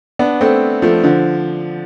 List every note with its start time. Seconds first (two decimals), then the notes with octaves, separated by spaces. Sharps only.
0.19 B3 D4
0.41 A3 C4
0.82 F3 A3
1.04 D3 F3